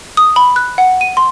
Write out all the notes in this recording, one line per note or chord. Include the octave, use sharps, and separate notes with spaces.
D#6
B5
F#6
F#5
D#7
C6